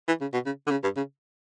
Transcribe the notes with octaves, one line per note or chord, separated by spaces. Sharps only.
E3
C#3
B2
C#3
D3
C#3
G2
C#3